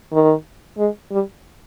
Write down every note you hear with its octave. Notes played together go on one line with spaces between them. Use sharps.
D#3
G#3
G3